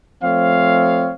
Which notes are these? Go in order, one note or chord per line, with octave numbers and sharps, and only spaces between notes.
F3 A3 C4 C#5 F5